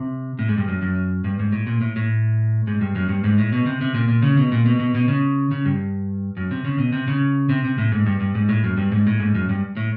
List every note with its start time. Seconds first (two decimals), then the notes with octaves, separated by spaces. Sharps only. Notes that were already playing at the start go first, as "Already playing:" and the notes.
Already playing: C3
0.39 A2
0.49 G#2
0.58 G2
0.68 F#2
0.82 F#2
1.24 G2
1.39 G#2
1.52 A2
1.67 A#2
1.81 A2
1.96 A2
2.67 G#2
2.81 G2
2.95 F#2
3.09 G2
3.24 G#2
3.38 A2
3.52 B2
3.66 C3
3.81 C3
3.94 A#2
4.08 A#2
4.22 C#3
4.37 B2
4.52 A#2
4.66 B2
4.79 B2
4.95 B2
5.08 C#3
5.51 C#3
5.65 G2
6.37 F#2
6.51 C3
6.65 C#3
6.78 B2
6.92 C3
7.08 C#3
7.49 C3
7.64 C3
7.78 A2
7.92 G#2
8.06 G2
8.20 G2
8.35 G#2
8.49 A2
8.64 F#2
8.77 G2
8.92 G#2
9.07 A2
9.20 G#2
9.35 F#2
9.49 G2
9.77 A2